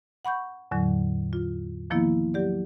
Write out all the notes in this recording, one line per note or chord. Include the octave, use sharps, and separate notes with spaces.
F#5 B5 C#6 G6
E2 A2 D3 F#3
F4
D#3 F3 A#3 B3 E4
F#3 G4 D5